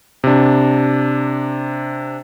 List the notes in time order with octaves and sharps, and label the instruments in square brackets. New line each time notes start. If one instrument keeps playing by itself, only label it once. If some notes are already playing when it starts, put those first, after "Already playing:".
[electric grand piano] C3 D4